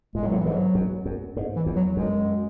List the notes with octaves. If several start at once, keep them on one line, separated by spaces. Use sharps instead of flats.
A2 G#3
G#2
A2 F#3
E3
G#2
F#3
F#2
F#2
G#2
E3
E2
F#3
F#2 G#3